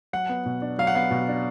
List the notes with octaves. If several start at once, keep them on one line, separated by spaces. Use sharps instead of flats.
F#3 F#5
B3
B2
D4
F#3 F5
F#5
B3 F5
B2
D4